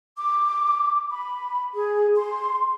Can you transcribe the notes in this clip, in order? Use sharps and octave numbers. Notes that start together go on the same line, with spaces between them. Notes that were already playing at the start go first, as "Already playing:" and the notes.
D6
B5
G#4
C6